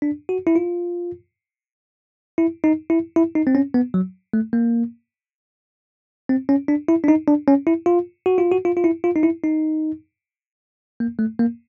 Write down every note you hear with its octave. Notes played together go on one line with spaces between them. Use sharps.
D4
F#4
E4
F4
E4
D#4
E4
E4
D#4
C4
C#4
B3
F#3
A3
A#3
C4
C#4
D4
E4
D4
D#4
D4
C#4
E4
F4
F#4
F4
F#4
F4
F4
E4
F4
D#4
E4
D#4
A#3
A3
A#3